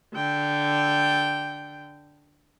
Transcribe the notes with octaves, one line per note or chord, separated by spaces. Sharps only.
D3 G5